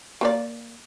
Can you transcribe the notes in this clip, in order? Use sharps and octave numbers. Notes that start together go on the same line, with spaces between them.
A#3 B4 D5